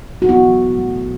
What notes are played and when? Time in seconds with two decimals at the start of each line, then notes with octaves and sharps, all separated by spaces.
0.22 F#4
0.29 B2 B3 E4
0.46 F#3
0.62 B2
0.78 A3
0.95 B2